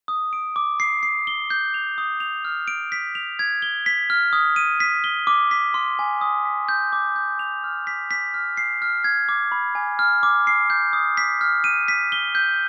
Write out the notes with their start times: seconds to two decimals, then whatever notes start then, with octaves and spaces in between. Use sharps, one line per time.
0.08 D#6
0.33 D7
0.56 D6
0.80 C7
1.03 C7
1.27 G7
1.50 G6
1.74 F7
1.98 D#6
2.20 F7
2.45 F6
2.68 D7
2.92 B6
3.15 F7
3.39 G#6
3.62 G7
3.86 B6
4.10 F6
4.33 D#6
4.56 D#7
4.80 B6
5.04 G7
5.27 D6
5.51 B6
5.74 C6
5.99 G#5
6.21 D#6
6.45 B6
6.69 G6
6.93 D6
7.16 G6
7.39 F7
7.64 F6
7.87 B6
8.11 B6
8.34 F6
8.57 C7
8.82 F6
9.04 G#6
9.29 D6
9.52 B5
9.75 G#5
9.99 F6
10.23 D6
10.47 C7
10.70 G6
10.93 D#6
11.17 B6
11.41 F6
11.64 D#7
11.88 B6
12.12 G7
12.35 G6